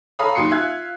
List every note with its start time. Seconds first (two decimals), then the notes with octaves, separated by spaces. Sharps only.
0.19 A4 C#5 F5 A#5 B5 D#6
0.35 D#2 F#3 C6 D#6 C7 C#7
0.51 F4 E5 F5 F#6 G#6